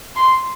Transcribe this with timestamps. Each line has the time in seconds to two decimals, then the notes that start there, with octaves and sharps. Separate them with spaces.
0.16 C6